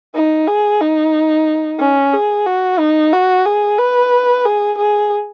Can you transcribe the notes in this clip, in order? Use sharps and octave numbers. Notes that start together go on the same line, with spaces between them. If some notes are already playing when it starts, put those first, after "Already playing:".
D#4
G#4
D#4
C#4
G#4
F#4
D#4
F#4
G#4
B4
G#4
G#4